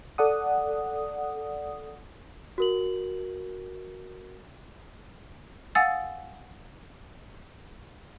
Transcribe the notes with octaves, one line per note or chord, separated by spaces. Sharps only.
A4 D5 F#5 D#6
F#4 A#4 F#7
F5 F#5 G#5 D#6 E6 A6